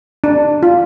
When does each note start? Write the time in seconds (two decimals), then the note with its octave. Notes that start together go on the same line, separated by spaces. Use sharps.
0.24 D4
0.63 F4